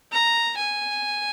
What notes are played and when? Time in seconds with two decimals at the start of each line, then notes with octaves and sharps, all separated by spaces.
0.12 A#5
0.57 G#5